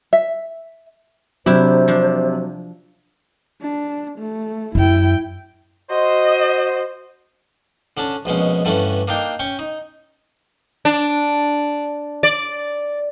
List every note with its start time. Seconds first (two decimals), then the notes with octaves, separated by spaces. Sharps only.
0.13 E5
1.46 C3 F#3 D4 E4 G4 C5
1.88 F3 D4
3.61 D4
4.18 A3
4.75 F#2 E4 G5
5.91 F#4 C5 D#5
7.97 D3 C#4 D4 A5
8.25 A#1 B2 G#3 C#4
8.65 G2 D3 E3 A3 C#4
9.08 A#3 D4 D#4 A#4 G5
9.39 C#4 G5 C#6
9.59 D#4
10.85 D4
12.23 D5